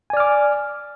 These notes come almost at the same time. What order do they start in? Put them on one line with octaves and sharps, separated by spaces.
G#5 D5 F6 D6